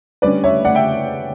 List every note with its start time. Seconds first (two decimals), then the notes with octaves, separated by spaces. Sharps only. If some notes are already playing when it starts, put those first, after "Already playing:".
0.22 D3 G3 C#4 B4 D5
0.44 C#5 E5
0.65 D5 F#5
0.75 E5 G5